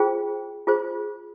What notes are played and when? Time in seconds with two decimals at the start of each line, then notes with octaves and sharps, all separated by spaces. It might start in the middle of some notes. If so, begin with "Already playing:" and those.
Already playing: F4 G#4 C5 G5
0.67 F4 G#4 C5